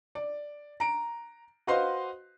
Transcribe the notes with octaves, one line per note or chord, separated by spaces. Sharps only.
D5
A#5 D7
F#4 B4 C5 D#5 F5 C6